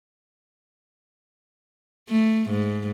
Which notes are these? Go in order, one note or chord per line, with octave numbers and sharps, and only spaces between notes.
A3
G#2